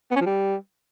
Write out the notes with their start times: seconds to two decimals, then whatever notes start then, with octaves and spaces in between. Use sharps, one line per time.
0.11 B3
0.16 C#4
0.21 F3
0.26 G3